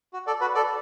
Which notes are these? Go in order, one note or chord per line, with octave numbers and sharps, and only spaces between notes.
F#4
A4 D5
F#4 B4
A4 D5